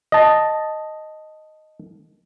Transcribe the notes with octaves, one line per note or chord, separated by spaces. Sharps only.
D#5 A5